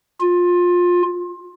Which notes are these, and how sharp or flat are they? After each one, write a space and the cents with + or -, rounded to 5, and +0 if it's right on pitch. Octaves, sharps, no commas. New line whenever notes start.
F4 +20